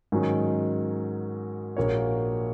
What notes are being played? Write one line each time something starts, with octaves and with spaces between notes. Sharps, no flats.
G#2 D#3 F#3 C#4
A#1 A#2 A#3 F#4 C#5